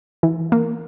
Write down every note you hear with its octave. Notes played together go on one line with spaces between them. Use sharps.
E3
A#3